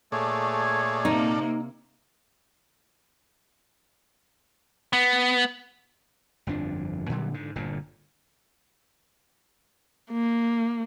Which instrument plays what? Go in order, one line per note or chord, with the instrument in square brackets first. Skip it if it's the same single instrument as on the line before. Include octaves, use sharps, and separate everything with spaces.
[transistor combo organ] A#2 A4 D5 [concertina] A3 G#4 C#5
[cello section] C3 A#3 [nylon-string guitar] D#4
[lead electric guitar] B3
[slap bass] G1 F2 F3 D4
A#2 D3 F#3 G3
G#2 D3
G1 A#2 D3
[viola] A#3